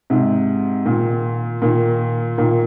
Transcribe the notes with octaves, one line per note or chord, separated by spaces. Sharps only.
G#2 C3
A#2 D#3
A#2 D#3
A#2 D#3